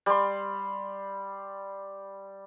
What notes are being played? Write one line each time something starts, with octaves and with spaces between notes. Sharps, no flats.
G3 C6